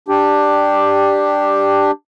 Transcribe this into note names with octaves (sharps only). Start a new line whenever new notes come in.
D4 G4